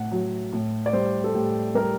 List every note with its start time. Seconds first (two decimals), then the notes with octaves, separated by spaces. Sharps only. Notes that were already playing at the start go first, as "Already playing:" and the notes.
Already playing: A2 F#5
0.12 F#3
0.52 A2
0.86 D5
0.93 G3 C5
1.24 A4
1.34 A2 G4
1.75 G3 A#4